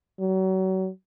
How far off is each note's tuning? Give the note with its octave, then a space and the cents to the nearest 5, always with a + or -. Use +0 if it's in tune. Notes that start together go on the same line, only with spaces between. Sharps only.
F#3 +35